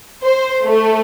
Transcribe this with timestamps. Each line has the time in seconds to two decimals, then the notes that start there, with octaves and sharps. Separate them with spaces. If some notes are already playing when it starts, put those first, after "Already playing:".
0.23 C5
0.65 A3